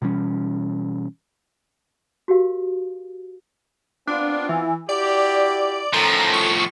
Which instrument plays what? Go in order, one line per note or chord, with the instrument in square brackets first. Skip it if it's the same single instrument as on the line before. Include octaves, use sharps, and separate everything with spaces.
[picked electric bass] B2 E3 G3 C#4
[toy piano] F#4 G4 A#4 F5
[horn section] B3 C4 F4 [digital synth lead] D4
[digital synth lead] E3
[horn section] E4 F#4 G4 [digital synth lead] D5
[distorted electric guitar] A2 F3 [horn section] D#3 C#4 A4 [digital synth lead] A#5
[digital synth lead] C#6